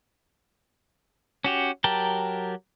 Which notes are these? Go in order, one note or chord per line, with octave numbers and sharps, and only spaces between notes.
C#4 F#4 G4
F#3 G4 A#4 G5 A5